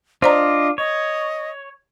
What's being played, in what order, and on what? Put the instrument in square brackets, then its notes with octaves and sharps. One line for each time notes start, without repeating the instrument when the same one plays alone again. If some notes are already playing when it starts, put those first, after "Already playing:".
[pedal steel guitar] D4 F4 [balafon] C5 D5 A#5 [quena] D#5
[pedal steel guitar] C#5 [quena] D#5